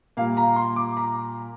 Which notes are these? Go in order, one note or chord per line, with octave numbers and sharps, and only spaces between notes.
A#2 G3 A#3 F5
A#5
C6
D6
A#5